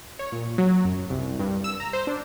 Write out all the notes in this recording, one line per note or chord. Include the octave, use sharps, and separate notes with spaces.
C#5
A#2
F#3
F#2
C2
G2
E6
A#5
C5
D4